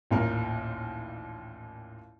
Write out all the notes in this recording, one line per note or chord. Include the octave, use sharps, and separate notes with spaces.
A1 D#2 A#2 A#4